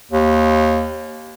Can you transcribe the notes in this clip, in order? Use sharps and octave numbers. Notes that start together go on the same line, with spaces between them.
D#2